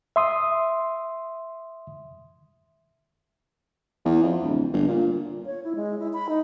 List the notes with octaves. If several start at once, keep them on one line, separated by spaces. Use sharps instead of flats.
E5 C6 D#6
E2
F2
D1
G1
A#2
C#5
E4
G#3
E4
B5
D#4